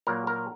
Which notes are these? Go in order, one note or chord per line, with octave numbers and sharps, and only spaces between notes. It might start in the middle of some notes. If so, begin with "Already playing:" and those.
A#2 F#3 A#3 A#4
A#4